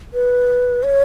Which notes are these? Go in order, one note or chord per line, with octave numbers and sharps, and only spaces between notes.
B4
C#5